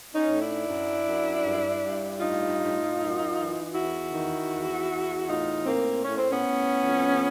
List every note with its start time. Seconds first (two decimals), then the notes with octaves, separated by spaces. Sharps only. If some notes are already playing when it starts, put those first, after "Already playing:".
0.14 C#4 D#4
0.28 A2
0.40 D4 E4
0.66 F#2
1.05 F#2
1.43 G2
1.82 G2
2.20 A2 D#4 F4
2.59 A2
2.97 F#2
3.35 E3
3.74 E2 E4 F#4
4.12 D#3
4.51 E2
4.89 E2
5.27 A2 D#4 F4
5.66 A2 A#3 C4
6.04 A2 C#4
6.18 C4
6.32 B3 C#4
6.42 A2
6.81 F2